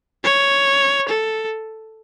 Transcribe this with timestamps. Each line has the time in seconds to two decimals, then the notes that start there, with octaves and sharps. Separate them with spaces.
0.24 C#5
1.09 A4